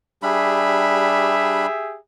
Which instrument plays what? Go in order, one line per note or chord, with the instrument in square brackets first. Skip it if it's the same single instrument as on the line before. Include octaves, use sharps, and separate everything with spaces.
[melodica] G3 D4 B5 [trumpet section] G4 G#4 E5